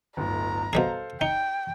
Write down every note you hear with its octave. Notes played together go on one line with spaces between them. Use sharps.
D1 G1 A#5
B2 G3 G#4 A4 C5 F5
D#4 G5 C#7 G7